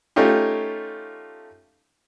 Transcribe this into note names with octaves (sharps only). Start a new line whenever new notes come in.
A3 C#4 D#4 F4 G4